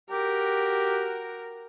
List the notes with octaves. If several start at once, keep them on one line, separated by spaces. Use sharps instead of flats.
F#4 G4 A#4